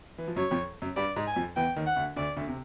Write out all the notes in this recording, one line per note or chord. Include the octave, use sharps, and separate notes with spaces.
E3
F3
F#2 F#3 C#5
F2 F3
F#2 F#3
G2 G3 D5
G#2 G#3
G#5
F2 F3
E2 E3 G5
D#2 D#3
F#5
D2 D3
D2 D3 D5
D2 D3
C3